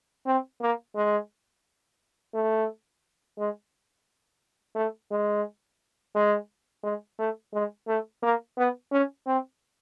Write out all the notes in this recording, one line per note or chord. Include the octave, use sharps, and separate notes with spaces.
C4
A#3
G#3
A3
G#3
A3
G#3
G#3
G#3
A3
G#3
A3
A#3
B3
C#4
C4